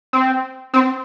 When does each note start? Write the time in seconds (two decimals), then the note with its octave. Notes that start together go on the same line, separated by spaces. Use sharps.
0.13 C4
0.74 C4